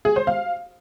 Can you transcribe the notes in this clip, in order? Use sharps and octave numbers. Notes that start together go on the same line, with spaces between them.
G#4
C5
F5